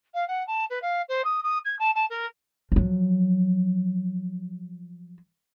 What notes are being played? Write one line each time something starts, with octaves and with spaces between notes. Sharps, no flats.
F5
F#5
A5
B4
F5
C5
D#6
D#6
G#6
A5
A5
A#4
F3 F#3